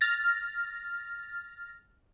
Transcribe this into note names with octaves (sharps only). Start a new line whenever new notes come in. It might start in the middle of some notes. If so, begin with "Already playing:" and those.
F6 A6 A#6